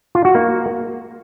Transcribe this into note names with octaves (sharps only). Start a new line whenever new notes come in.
F4
F#4
A#3